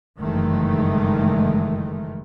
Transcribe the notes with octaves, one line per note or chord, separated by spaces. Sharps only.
F#1 G2 D#3 E3 G#3 A3